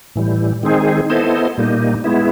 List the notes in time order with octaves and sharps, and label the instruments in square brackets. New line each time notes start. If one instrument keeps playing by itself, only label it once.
[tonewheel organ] A2 E3 G3
D#3 G#3 C4 D#4 G#4
B3 E4 A4 C5 D#5
A#2 G3 A#3 D#4
G#3 B3 E4